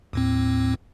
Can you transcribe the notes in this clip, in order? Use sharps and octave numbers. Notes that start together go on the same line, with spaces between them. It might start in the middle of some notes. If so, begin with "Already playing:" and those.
D#2 A2 C4